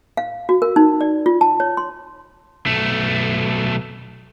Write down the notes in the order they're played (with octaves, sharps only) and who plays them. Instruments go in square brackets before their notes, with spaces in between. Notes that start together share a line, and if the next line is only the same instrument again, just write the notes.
[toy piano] F5
F#4
A#4
D#4
D5
F4
A5
C#5
C6
[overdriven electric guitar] B1 A3